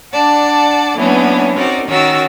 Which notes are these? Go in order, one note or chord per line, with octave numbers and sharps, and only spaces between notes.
D4 D5 F#5 A5
E3 F#3 A#3 B3 C#4 D4
C4 C#4 D#4 F#4 A#4 D5
D#3 C#4 F#4 A#4 E6 A6